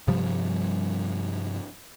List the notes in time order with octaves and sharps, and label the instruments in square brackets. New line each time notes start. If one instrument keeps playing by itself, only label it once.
[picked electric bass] G2 C3 F3 G3